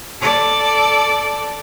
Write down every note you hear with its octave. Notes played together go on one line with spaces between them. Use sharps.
A4 D5